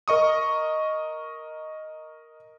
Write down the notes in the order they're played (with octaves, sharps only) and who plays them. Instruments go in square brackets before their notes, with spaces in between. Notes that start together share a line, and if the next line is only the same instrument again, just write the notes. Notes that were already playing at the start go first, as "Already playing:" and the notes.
[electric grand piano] A#4 D#5 C#6 D#6